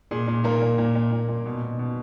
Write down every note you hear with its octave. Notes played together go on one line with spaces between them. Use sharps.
A#2 G#4
A#2
A#2 A#3 A#4
A#2
A#2
A#2
A#2
A#2
B2
B2
B2